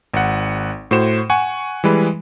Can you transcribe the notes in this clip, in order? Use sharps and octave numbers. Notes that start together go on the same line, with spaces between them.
G#1 F#5
A2 F#4 C5 E7
F#5 G#5 C#6
E3 G3 G#3 B4